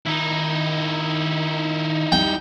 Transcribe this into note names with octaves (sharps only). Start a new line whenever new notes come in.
D#3 D#4 E4
G3 G5